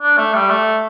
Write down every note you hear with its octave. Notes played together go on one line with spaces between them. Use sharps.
D4
A3
G3
A3